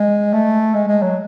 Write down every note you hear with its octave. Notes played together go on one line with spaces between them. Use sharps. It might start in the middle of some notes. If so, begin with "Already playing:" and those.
Already playing: G#3
A3
G#3
G#3
F#3